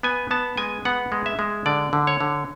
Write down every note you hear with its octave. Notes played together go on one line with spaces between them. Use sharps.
B3 G#5
B3 A5
G#3 G#5
B3 F#5
G#3
E5
G#3
D3 D5
D3
C#5
D3